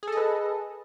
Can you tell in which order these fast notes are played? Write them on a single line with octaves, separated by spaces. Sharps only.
G#4 A4 D#5 B4